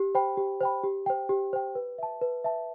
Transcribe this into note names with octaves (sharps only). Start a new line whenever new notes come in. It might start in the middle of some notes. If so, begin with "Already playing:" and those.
Already playing: G4
C5 G5 B5
G4
C5 G5 B5
G4
C5 G5
G4
C5 G5
B4
E5 A5
B4
E5 A5